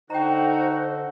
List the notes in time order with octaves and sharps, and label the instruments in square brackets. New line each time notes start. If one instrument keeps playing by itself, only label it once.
[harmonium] D3 [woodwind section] D#4 F#4 [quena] C5 [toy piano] G5 A#5